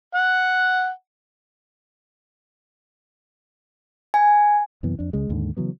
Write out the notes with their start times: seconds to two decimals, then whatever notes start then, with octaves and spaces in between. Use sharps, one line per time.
0.15 F#5
4.14 G#5
4.83 F#2 C3 E3 B3
4.99 F2 D4
5.13 C#2 C#3 G#3
5.29 D#2 G#2 D3
5.57 C#3 E3 F#3 B3